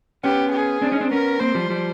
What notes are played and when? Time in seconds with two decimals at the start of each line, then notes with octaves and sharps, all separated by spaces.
0.24 B3 C#4 G4
0.52 G#4
0.81 C4 D4
0.92 C#4 D#4
1.01 C4 D4
1.11 B3 C#4 A#4
1.40 A#3 C4 C5
1.55 F3 G3
1.70 F3 G3